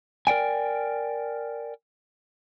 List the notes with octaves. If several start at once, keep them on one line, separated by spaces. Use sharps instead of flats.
A#4 D5 G5 G#5